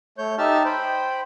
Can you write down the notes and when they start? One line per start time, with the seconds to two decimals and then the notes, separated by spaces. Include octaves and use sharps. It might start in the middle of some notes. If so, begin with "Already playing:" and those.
0.18 A3 C#5 G6
0.38 D#4 G4 E5 A5 E6 F6
0.65 C5 G5 B5